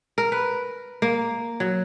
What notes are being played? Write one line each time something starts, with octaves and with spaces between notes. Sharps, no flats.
A#4
B4
A#3
F#3